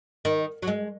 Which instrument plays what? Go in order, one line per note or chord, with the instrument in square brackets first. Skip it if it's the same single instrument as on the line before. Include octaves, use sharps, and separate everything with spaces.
[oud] D#3
F#3
G#3